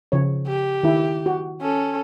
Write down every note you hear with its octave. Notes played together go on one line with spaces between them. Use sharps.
C#3 F3 C#5
G4
D#3 E4
F#4
C#4 A4